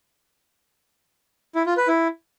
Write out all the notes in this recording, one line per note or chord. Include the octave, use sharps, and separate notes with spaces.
E4
F4
B4
E4